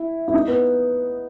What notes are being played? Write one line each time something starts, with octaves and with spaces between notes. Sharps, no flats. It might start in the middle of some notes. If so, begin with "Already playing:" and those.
Already playing: E4
E4
D#4
B3